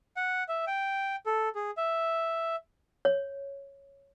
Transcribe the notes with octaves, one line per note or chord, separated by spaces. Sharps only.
F#5
E5
G5
A4
G#4
E5
C#5